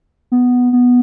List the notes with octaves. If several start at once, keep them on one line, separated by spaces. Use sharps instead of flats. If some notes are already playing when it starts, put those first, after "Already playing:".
B3
B3